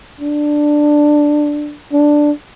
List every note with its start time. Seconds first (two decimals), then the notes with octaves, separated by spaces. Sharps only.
0.21 D4
1.92 D4